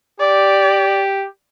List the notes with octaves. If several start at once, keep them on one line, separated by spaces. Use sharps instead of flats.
G4 D5